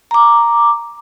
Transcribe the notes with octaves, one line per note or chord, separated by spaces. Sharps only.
A#5 D6